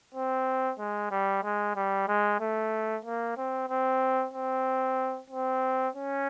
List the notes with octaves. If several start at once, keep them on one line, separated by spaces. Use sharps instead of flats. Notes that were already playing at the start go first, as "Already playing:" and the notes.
C4
G#3
G3
G#3
G3
G#3
A3
A#3
C4
C4
C4
C4
C#4